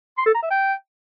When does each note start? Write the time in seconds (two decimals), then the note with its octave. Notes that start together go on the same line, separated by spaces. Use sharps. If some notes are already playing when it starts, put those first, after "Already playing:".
0.18 C6
0.26 A4
0.34 A#5
0.42 E5
0.51 G5